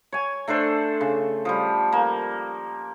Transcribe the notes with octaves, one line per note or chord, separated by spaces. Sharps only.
C#5 G#5
A3 D4 A4 C5
C#3
F3 G3
A#3